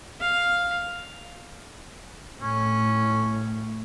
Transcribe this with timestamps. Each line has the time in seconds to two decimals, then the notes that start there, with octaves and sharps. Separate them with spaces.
0.20 F5
2.40 A2 C#4